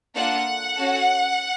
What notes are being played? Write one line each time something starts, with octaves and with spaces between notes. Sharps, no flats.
A#3 D4 F4 A4 F#5
C#4 F#4 A4